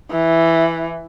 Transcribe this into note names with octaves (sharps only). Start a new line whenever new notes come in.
E3